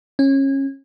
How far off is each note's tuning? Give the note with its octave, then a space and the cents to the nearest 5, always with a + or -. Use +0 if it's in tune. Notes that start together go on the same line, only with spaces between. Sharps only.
C#4 -25